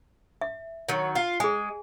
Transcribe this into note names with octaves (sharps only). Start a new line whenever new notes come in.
E5
D#3 F#3
F4
G#3 G#4 G#5